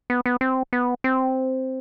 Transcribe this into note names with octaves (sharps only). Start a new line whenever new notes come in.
B3
B3
C4
B3
C4